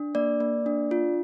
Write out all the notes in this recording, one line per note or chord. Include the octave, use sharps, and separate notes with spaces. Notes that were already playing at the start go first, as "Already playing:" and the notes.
Already playing: D4
A#3 D5
A#3
D4
F4